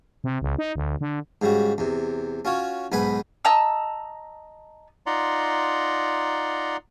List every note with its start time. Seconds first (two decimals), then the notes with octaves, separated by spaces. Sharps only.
0.24 C3
0.42 C#2
0.58 D#4
0.76 D2
1.01 D3
1.42 G#2 C#3 G3 F#4
1.78 E2 C3
2.45 C#4 F4 F#4 C#5
2.92 B1 G#2 B3 B4 G#5 B5
3.45 D#5 A5 A#5 E6
5.06 D#4 F4 D5 F#5 A#5 C6